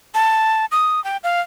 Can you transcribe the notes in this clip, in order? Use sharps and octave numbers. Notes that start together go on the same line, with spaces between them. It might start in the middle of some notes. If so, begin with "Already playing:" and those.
A5
D#6
G5
F5